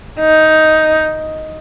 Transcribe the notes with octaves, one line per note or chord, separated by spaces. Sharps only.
D#4